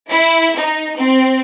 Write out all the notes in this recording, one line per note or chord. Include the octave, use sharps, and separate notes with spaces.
E4
D#4
C4